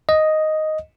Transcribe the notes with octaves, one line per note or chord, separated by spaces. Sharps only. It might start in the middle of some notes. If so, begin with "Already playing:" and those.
D#5